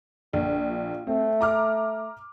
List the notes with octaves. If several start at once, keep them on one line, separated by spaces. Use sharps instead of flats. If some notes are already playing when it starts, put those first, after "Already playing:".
A#1 D3
F4
A3 C4
A#5 D6 F6